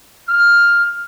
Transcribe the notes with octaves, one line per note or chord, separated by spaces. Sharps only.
F6